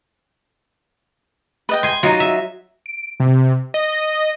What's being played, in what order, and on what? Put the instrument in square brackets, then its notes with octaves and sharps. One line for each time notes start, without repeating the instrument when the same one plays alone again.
[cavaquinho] B4 D#5 G5
[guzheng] G#5 C6
[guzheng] F#3 [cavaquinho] D#4 F4
[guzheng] E5
[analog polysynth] D7
C3
D#5